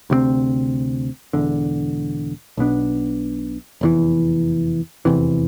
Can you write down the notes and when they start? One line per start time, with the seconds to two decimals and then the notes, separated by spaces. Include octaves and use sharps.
0.10 D2 C3 G3 C4
1.33 E1 E2 D3
2.57 B1 B2 B3 D4
3.81 F1 E2 C3 E3
5.05 F1 E2 C3 E3